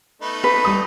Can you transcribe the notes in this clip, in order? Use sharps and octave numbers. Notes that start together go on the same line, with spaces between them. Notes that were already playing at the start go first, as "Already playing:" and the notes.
A3 B3 D#4
B4
G3 D#6